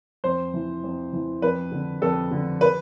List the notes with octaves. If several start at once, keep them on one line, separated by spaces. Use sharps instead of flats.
F2 C5
E3
F2
E3
F2 B4
D3
F2 A4
D3
B4